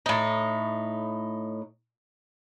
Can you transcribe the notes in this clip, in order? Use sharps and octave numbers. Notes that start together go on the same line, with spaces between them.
A2 D#4